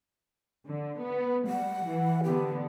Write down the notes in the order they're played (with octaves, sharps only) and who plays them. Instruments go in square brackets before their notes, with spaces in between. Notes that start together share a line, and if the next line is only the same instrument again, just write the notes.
[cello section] D3
B3
[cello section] G3 [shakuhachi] F#5
[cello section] E3
[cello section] D3 B3 [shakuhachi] G4